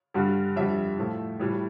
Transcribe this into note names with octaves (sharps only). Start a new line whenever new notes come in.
G2 D3 G3
F2 D3 G3 E5
A2 F3 A3
A2 E3 G3